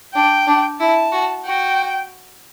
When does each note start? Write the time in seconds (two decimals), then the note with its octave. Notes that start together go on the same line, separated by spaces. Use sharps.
0.14 D4 G5
0.47 D4
0.80 E4 A5
1.12 F#4
1.45 F#4 G5